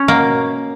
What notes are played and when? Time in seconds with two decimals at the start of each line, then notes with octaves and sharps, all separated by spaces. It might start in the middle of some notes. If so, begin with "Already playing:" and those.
Already playing: C#4
0.08 B2 A#3